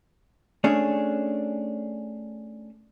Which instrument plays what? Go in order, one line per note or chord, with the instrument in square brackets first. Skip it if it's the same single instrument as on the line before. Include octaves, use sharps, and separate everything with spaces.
[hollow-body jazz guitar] A3 C#4 D4 G#4